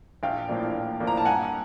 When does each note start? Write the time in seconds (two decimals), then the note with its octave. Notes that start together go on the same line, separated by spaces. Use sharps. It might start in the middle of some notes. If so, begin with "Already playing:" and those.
0.23 A#1 F5 G5
0.48 A2 F3 A#3 D4
0.75 A#1
1.00 A2 F3 A#3 D4
1.07 A#5
1.17 A5
1.25 G2 F#5 G#5